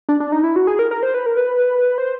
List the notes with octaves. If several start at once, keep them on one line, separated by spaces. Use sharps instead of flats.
D4
D4
D#4
E4
F#4
G#4
A#4
A#4
C5
B4
A#4
B4
C5